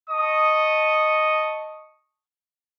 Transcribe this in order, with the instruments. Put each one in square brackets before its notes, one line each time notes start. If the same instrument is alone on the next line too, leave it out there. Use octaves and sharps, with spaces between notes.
[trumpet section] D#5 A5 C#6 D#6